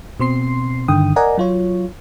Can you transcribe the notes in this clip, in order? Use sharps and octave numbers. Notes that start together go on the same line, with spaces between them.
B2 C4 C6 C7
G2 D3 D#3 G5 D#6
A#4 D5 D#5 F#5 G#5 A#5
F#3 F4 C#5